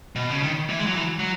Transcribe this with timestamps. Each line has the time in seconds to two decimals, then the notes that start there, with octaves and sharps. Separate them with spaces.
0.16 B2
0.30 C#3
0.43 D#3
0.69 E3
0.79 G#3
0.87 F#3
0.95 E3
1.19 F#3